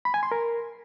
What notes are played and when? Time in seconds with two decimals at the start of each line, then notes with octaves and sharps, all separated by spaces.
0.05 B5
0.14 G#5
0.23 C6
0.32 A#4